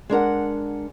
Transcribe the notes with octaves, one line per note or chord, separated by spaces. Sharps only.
G#3 D4 A#4 F#5